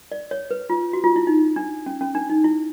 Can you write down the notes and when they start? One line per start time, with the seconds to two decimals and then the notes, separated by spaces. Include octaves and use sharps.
0.12 D5
0.31 C#5
0.51 B4
0.70 F4
0.93 F#4
1.04 F4
1.16 E4
1.27 D#4
1.56 D4
1.86 C#4
2.01 C#4
2.15 D4
2.30 D#4
2.44 E4